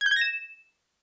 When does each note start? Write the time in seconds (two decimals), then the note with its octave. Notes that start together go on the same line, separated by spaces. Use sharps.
0.01 G#6
0.06 G6
0.11 G#6
0.16 A#6
0.21 E7